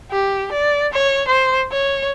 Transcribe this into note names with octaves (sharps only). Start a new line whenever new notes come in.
G4
D5
C#5
C5
C#5